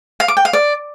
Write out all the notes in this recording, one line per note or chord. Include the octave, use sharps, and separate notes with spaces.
F5
D6
G5
F5
D5